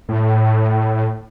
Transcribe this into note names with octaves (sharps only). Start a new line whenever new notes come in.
A2